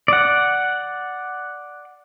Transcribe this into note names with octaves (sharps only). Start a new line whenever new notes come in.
D5 F#5